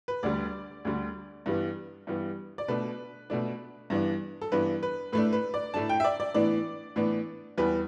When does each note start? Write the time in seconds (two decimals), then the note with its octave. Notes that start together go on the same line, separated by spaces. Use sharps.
0.08 B4
0.23 D2 D3 G3 D5
0.85 D2 D3 G3
1.46 G2 E3 G3 B3
2.07 G2 E3 G3 B3
2.58 D5
2.68 B2 A3 D4 B4
3.30 B2 A3 D4
3.90 G2 E3 B3 D4
4.41 A4
4.52 G2 E3 B3 D4 B4
4.83 B4
5.12 A2 A3 D4 B4
5.33 B4
5.54 D5
5.74 A2 A3 D4 A5
5.89 G5
6.00 E5
6.04 D5
6.20 D5
6.34 A2 E3 B3 D4 D5
6.96 A2 E3 B3 D4
7.58 E2 E3 G3 B3 B4